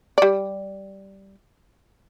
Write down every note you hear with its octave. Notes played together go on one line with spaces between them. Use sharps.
G3 D5